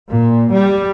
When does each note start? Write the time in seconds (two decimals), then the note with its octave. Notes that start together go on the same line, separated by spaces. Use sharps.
0.10 A#2
0.51 G3